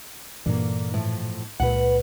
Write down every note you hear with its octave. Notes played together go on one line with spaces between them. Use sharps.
G2 A#2 D3 E3 A#3
A2 F3
C#2 A#2 B4 F#5